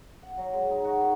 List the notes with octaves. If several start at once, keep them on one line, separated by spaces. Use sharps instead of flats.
F#5
F#3
G#3
D#4
F#4
D#3